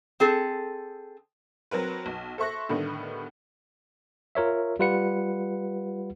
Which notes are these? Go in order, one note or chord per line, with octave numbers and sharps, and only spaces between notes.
C4 G#4 A4
F#3 C4 A#4 B4
B1
A4 C5 E5 C#6 F#6 A#6
A2 D3 D#3 G3 A3 B3
F4 A#4 C#5 E5
G3 F4 B4 F#5 C#7